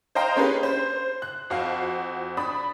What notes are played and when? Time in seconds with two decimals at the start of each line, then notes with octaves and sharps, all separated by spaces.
0.15 C5 D#5 F5 G5 A#5 C6
0.36 A#3 C#4 D4 G4 G#4 B4
0.63 C5
1.22 F#6
1.50 F2 F#4 F5
2.37 D4 B5 D#6